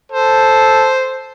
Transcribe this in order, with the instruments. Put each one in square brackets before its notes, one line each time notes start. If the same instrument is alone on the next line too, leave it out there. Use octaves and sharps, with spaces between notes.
[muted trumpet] A4 [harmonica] C5